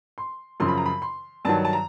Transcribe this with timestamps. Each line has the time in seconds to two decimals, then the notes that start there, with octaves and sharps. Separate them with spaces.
0.18 C6
0.60 F#2 C#3 F3 C6
0.68 B5
0.78 A#5
0.86 B5
1.02 C6
1.45 G2 D#3 F#3 A5
1.65 A5
1.73 A#5